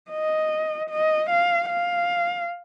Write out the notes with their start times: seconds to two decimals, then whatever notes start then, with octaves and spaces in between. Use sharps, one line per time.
0.11 D#5
0.90 D#5
1.30 F5
1.69 F5